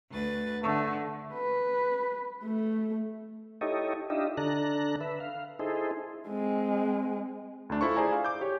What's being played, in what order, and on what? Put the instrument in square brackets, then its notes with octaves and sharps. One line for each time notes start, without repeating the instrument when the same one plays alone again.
[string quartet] D2 B4 A6
[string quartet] D3 [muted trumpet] A3
[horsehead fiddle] B4
A3
[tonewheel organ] D#4 E4 G4 A4 C#5 D#5
D4 D#4 F4 G4 D#5 E5
D3 D4 A4 A#5 F#6
B4 E5
F5
D#4 E4 G#4 A4 C5
[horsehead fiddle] G#3 C4
[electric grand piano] D2 A3 D4
E4 F4 A4 C5 C#6
G#4 C5 D5 G#5 A#5
F5
D6 G6
G4 C#5